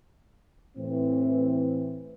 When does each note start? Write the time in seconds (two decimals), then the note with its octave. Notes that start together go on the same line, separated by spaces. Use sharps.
0.77 A2 E3 C4